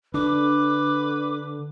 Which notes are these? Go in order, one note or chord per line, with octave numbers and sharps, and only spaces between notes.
D3 D4 B4 D6